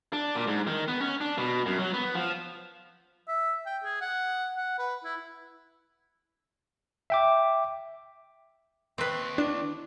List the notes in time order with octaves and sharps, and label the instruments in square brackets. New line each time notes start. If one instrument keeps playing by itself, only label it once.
[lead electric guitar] D4
A#2
G#2
D#3
B3
C#4
D4
B2
F#2
F#3
B3
F3
[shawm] E5
G5
G#4
F#5
F#5
B4
E4
[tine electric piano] E5 G5 D6
[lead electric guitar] D#2 [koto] C4 B4
[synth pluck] D4 [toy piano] E4 A5 D6